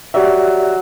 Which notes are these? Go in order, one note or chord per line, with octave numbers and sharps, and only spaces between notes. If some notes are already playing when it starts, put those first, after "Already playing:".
F#3 G4 D5 E5